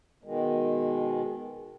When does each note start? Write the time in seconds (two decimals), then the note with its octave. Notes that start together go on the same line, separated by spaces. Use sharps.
0.24 B2 D#3 G#3